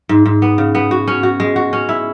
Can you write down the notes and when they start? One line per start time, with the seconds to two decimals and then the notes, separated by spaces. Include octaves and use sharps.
0.09 G#2
0.26 G#2
0.42 B3
0.58 C#3
0.75 B3
0.91 F#4
1.08 C#4
1.23 F#4
1.40 G#3
1.56 F#4
1.73 C#4
1.89 E4